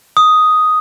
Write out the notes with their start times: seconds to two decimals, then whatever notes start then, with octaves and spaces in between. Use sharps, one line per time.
0.17 D#6